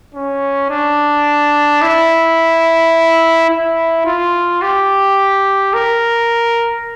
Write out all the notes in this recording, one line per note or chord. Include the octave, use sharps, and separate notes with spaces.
C#4
D4
E4
E4
F4
G4
A#4